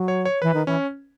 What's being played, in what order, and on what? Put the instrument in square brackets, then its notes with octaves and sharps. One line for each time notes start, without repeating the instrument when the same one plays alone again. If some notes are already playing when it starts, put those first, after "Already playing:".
Already playing: [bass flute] F#3
[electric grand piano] C#5
C#5
[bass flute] E3 [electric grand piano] B4
[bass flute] D#3
[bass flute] E3 [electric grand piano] C#4